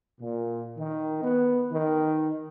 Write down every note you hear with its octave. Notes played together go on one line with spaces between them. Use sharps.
A#2
D#3
B3
D#3